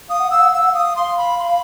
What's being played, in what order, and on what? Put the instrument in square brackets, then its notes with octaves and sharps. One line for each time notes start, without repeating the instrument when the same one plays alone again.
[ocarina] F5 [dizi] D#6
[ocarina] F#5
[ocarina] F5 [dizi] E6
[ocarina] F#5
[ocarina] F5 [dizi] E6
[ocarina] F#5
[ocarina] F5 [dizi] D#6
[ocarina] F5 [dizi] C6
[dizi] B5
C6
B5